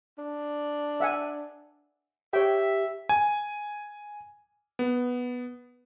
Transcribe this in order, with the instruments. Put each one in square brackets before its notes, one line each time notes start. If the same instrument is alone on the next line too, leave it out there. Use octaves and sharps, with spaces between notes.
[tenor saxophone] D4
[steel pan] E5 F#5 G#5
[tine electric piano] G4 [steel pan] C#5 G5 [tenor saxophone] E5
[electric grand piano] G#5
B3